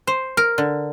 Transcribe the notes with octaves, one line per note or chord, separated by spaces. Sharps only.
C5
A#4
D3